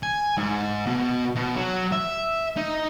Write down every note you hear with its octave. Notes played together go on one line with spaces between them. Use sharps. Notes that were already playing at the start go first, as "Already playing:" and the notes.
G#5
G#2
B2
B2
F#3
E5
D#4